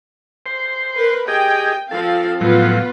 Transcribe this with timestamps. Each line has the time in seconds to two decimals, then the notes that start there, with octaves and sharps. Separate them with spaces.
0.46 C5
0.97 A#4 B4
1.28 G4 G#4 D#5 G5
1.91 F3 C4 A4 F5
2.41 A2 F3 F#3 B3 F4 B4